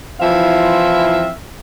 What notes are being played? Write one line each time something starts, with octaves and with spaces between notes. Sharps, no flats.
E3 F3 C4 E4 E5 F5